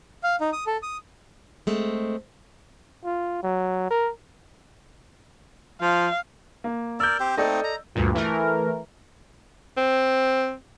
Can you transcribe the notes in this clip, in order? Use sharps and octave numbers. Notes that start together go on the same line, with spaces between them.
F5
D#4
D#6
A4
D#6
G#3 A3 C4
F4
F#3
A#4
F3 F5
A#3
A#4 D5 E6 G6
C4 G4 C5
A3 C4 D#4 A4 D5 D#5
A#5
D2 G2 A#2
E3 A3 A#4
C4